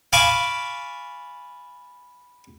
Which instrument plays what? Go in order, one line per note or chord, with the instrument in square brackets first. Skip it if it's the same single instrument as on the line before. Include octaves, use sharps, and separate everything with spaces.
[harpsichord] F5 G#5 A5 B5 C#6 D6